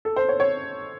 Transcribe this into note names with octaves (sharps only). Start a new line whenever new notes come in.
A4
C5
C#5
C#5